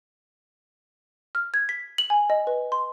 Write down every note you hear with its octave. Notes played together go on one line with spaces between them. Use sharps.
F6
G#6
B6
F#7
G#5
D#5
B4
C6